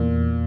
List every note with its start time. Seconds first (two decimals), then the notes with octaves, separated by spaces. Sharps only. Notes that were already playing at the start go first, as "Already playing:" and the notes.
Already playing: E2 A#2